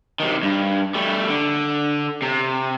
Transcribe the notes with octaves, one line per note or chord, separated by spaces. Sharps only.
C3 D#3
G2
G3 A3
D3
C3